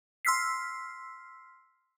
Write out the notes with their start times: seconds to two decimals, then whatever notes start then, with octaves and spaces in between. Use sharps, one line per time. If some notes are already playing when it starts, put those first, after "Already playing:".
0.25 C6 E6 F6 B6 C7